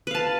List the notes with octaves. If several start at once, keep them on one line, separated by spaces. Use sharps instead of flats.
B4 F5 A5